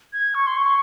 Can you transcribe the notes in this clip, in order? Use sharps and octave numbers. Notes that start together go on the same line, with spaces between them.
G#6
C#6
C6
C#6